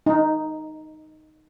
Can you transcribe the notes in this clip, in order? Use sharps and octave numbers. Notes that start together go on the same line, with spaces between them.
D#4